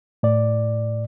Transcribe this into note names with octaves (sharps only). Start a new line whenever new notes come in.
A2 D5